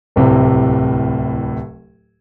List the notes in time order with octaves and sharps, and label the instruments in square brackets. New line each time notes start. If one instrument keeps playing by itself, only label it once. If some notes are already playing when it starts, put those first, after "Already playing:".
[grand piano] D1 C2 A2 C3